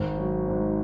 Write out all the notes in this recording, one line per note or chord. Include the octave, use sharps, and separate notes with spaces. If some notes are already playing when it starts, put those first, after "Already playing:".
Already playing: G#1
F#3
G#2